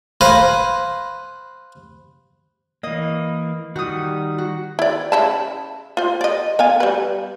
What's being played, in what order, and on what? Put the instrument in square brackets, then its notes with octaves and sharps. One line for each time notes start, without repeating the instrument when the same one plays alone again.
[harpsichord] B4 C5 F5 G#5 A#5 B5
[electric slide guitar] E3 A#3 [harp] D#5
[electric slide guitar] D#3 G3 [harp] F#4 D#6
[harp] F#4
[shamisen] E4 D5
C#3 E4 A5
F4 C5
D5 D#5
B3 F5 G#5
G3 B4